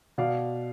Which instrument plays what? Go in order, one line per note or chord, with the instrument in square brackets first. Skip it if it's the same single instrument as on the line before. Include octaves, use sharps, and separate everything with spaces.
[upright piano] B2 D5 F5